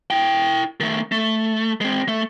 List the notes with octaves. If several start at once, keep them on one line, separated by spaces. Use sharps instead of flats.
E4 G5
D#3 A3
A3
G#3 C4
A3